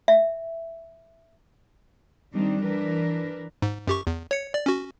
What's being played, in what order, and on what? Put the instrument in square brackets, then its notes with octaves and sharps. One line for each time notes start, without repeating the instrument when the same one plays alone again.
[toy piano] E5
[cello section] D#3 G3 C4 D4 D#4
E3 D4 A#4 B4
[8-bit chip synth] G#2
F#2 G4 C#6
E2
C#5 C#7
D5
C#4 F#4